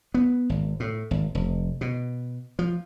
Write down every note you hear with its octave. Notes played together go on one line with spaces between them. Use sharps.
B3
G#1
A2
G#1
F1
B2
F3